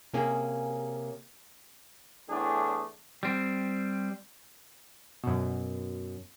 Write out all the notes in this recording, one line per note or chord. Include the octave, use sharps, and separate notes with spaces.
C3 A#3 C#4 G#4
E2 A2 A3 D4 G#4
G3 C4
F#2 B2